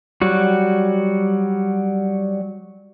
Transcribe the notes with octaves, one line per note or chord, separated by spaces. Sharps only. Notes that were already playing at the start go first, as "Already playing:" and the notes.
F#3 G3 F#4